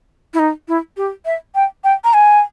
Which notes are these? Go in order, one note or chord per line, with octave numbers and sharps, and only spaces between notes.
E4
D#4
E4
G4
E5
G5
G5
A#5
G#5